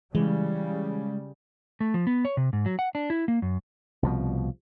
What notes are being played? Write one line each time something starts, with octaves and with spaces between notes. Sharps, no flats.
C#3 E3 G3 G#3
A3
F3
B3
C#5
C3
G#2
F#3
F#5
D4
E4
A#3
F#2
C2 B2 F3